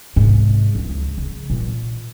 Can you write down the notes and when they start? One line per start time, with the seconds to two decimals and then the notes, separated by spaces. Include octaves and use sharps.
0.16 G#2 C3
0.75 C#2 E4
1.18 C#3
1.50 A#2 D#3